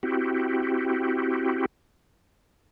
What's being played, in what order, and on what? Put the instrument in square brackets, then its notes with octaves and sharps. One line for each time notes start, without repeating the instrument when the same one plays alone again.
[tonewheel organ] C4 E4 F#4 G4